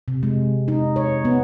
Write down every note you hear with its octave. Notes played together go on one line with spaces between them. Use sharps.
C3
G#3
D#4
C#5
B3